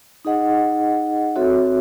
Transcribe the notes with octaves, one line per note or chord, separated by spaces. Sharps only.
D#4 G#4 D#5 F#5
C4 F#4 A4 C#5 E5